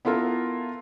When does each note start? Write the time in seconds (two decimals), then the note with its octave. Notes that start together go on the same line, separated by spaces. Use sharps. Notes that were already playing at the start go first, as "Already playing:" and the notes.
0.05 B3 E4 F4 A4 A#4